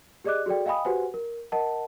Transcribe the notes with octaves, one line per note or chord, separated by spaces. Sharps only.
G4 G#4 D5 D#5 D6 F#6
F#4 G#4 A4 D5 G5
D#5 F5 G5 G#5 B5 D#6
F#4 G4 B4 C5 F#5 G#5
A#4
A#4 D#5 F#5 A5